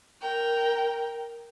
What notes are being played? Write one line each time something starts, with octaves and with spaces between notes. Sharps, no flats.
A#4 G5